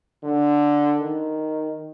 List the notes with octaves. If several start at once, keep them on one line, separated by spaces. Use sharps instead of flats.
D3
D#3